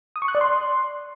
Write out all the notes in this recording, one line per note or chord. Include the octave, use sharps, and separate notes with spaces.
D#6
C#6
F#6
D5
C6